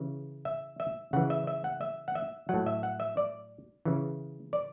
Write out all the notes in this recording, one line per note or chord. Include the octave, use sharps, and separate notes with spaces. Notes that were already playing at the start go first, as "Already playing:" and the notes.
Already playing: C#3 E3
E5
E5
C#3 E3 F#5
E5
E5
F#5
E5
F#5
E5
A2 F#3 F#5
E5
F#5
E5
D5
C#3 E3
D5